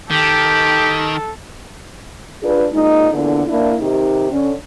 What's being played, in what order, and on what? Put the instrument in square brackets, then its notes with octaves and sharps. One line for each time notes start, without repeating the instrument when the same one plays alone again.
[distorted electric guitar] D#3 [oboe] G4 [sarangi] A4
[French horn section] D4 F4 G#4 B4
A#2 G#3 D#4
E2 A#2 D3
A#3 D4 E4
C3 D#3 D#4 G4
D3 C#4